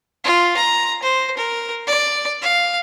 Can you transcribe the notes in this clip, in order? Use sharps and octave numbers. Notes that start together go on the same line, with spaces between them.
F4
A#5
C5
A#4
D5
F5